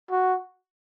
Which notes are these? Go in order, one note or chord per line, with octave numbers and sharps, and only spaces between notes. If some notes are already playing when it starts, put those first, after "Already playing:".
F#4